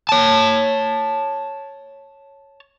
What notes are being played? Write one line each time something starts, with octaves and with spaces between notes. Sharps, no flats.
C#5 A5